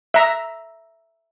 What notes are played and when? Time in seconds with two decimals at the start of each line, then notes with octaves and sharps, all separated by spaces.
0.14 E5 A#5